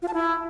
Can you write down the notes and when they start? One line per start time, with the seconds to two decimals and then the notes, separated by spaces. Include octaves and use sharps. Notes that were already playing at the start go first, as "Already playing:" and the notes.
0.02 F4
0.08 A5
0.14 E4